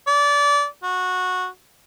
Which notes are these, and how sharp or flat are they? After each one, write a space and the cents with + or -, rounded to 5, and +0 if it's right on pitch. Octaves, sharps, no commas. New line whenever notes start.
D5 -25
F#4 -15